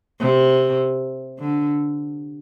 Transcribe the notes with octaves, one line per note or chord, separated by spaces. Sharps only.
C3
D3